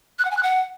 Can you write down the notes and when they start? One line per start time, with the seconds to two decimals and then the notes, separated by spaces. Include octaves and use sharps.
0.19 F#6
0.25 F#5
0.31 G#5
0.37 F#6
0.43 F#5